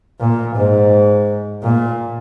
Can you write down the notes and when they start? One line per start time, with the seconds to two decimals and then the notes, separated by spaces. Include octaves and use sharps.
0.20 A#2
0.56 G#2
1.63 A#2